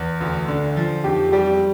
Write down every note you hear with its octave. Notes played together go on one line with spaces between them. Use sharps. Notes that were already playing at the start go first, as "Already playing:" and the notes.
Already playing: E2
D2
D3
F3
F2 G4
G3 G4